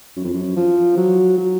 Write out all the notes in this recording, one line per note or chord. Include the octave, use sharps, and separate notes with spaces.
F#2
F2
F#2
F3
F#3
F#3